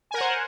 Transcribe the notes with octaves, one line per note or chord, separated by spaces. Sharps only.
A#4 C5 F#5 G#5